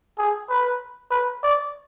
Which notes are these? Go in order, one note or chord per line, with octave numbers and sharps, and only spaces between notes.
G#4
B4
B4
D5